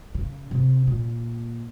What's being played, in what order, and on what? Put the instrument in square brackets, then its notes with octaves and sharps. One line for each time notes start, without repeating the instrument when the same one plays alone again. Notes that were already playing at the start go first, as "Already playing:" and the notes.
[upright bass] C#3
C3
A#2